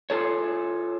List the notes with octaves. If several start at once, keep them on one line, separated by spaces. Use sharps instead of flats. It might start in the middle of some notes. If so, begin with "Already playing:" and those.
F4 G#4 A4 C#5